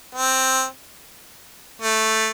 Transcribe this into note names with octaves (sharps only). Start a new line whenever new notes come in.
C4
A3